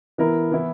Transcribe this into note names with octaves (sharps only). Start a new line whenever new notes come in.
E3 B3 E4 A#4
E3 B3 E4